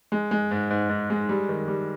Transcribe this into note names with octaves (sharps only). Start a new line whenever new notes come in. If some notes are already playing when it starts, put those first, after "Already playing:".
G#3
G#3
G#2
G#2
G#2
G#3
G3
D#3
G3